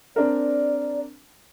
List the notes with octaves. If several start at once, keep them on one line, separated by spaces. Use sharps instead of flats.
C4 D4 A#4 D5